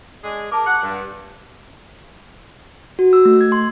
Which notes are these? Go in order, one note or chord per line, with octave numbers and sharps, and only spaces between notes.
G#3 D4 G#4
A#4 A5 D6
F#5
G2
F#4
E6
A3
G#6
C6